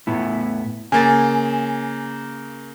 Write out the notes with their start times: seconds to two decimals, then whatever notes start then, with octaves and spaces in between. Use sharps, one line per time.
0.07 A2 B3 E4
0.92 C#3 A#3 G#5 A6